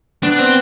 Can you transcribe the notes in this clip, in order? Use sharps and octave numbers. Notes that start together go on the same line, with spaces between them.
B3 D4
C4